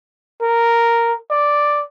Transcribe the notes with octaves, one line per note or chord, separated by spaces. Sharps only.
A#4
D5